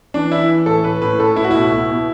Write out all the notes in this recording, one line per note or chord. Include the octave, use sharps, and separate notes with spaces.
E3 D4
E3 E4
E3
A2 A4
A2 B4
A2 B4
A2 A4
A2 E4
F#4
B2 E4
B2
B2